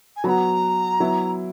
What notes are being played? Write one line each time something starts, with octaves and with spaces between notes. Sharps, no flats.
G#5
F#3 B3 F#4 A#5 B5
F#3 B3 E4